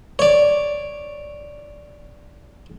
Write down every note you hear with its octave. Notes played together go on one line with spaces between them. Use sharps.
C#5 D5